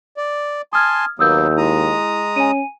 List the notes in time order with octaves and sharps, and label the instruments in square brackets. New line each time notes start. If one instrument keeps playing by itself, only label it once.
[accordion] D5
[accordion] G#5 A5 C6 [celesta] D#6 F6 G#6
[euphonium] D#2 [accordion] F#3 A#3 B3 [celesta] D#6 E6 G6
[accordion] G#3 A#5 D#6 [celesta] E4
[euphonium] C#4 [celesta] G#5 D#7